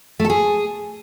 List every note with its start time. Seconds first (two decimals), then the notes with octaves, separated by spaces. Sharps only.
0.19 A3
0.25 A4
0.30 G#4